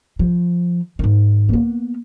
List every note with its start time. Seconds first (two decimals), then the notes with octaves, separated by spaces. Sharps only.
0.19 F3
0.99 G#2 D#3
1.49 A#3 B3